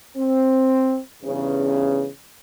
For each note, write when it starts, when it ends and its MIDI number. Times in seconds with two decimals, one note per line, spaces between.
0.17 0.97 60
1.23 2.07 40
1.23 2.07 43
1.23 2.07 49